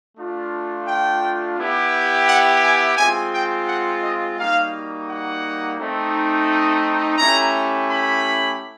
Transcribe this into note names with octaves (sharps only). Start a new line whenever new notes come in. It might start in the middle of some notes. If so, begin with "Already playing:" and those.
A3 D4 F4
G5
B3 E4 G4
F#5
G#5
G#3 C4 F4 G#5
G5
F#5
D#5
G3 A#3 D#4 F#4 F5
F#5
A3 C4 D#4
A3 C#4 E4 G4 A#5
B5